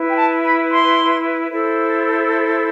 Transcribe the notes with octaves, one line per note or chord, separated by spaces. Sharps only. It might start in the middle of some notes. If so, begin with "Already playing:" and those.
Already playing: E4 B4
G5
A5
B5
C6
E4 A4 C5